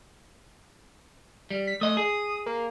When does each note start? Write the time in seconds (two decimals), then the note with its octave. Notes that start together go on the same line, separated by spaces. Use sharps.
1.51 G3
1.67 B6
1.81 A3 D#5 D#6
1.97 G#4
2.46 A#3